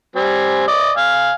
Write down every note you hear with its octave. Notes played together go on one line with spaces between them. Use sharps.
G3 C4 G#5
D5 D#5
F5 G#5